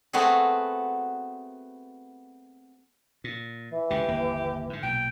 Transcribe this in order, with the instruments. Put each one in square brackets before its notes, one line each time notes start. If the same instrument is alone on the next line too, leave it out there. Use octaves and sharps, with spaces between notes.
[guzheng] A3 B3 C4 F#4 G#4
[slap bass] A#2
[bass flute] E3
[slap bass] C#2 D3 [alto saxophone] G4
[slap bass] G1 D#2 A#3
G#2 D3
[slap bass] B1 A#2 [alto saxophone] G5